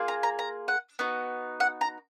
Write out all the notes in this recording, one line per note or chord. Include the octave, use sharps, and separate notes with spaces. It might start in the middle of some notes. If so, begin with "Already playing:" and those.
Already playing: A#3 F4 G#4
A#5
A#5
A#5
F#5
B3 D#4 F#4
F#5
A#5